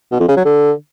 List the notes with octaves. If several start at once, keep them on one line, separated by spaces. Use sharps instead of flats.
B2
F2
C#3
F#3
D3